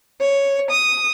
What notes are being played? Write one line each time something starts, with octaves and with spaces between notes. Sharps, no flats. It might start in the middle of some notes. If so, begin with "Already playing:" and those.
C#5
D#6